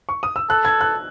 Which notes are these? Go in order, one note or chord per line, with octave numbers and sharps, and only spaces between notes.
C#6
D#6
E6
A4 F#6
G#6
F#6